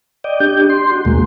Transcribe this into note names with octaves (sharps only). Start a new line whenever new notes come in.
D5 D#5 G5
D4 G4 G6
C6
F#4
D#2 B2 G#3 A#3